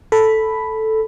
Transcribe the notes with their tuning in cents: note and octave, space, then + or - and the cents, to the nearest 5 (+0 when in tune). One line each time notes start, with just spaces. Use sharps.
A4 +0 B5 +0